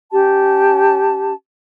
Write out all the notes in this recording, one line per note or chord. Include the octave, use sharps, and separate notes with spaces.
C#4 G4 A5